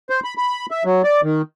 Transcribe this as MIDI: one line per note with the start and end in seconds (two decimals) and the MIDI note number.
0.10 0.20 72
0.24 0.34 83
0.38 0.66 83
0.71 0.83 76
0.85 1.02 54
1.04 1.21 74
1.23 1.42 51